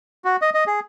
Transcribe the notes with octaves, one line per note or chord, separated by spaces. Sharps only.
F#4
D#5
D#5
G#4